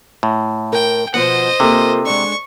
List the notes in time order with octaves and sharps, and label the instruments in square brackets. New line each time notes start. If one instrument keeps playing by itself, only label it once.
[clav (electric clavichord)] A2
[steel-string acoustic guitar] A#4 [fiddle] G5
[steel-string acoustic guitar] B2 F3 B3 [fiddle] C5 D#5 [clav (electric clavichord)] F#5
[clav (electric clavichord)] C3 [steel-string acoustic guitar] A#3 F4 A4
[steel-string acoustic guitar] G#3 D4 [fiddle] C#6